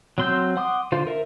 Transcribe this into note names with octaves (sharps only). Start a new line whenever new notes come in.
F#3 C4 C6 E6 G6
F#5 C6 D6 D#6
D3 F4 C5 F5
A#4 E5